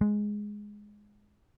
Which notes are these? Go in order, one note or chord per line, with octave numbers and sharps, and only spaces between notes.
G#3